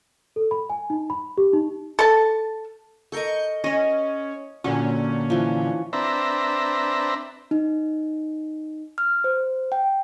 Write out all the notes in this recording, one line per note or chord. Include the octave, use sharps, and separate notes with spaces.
A4
B5
G#5
D#4
B5
G4
D#4
A4 A5
A4 A#4 D#5 C#6 G6 C#7
C#4 C#5 D#5
A#2 D3 F#3 C#4
E3 F3
C4 D4 B4 E5 A#5
D#4
F6
C5
G5